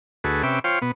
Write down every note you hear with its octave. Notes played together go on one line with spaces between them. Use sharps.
D2 F#4 G#4 A4 B4
C3 C#4 B4 E5 G5 D6
F4 C5 C#5 F5 G5
B2 B3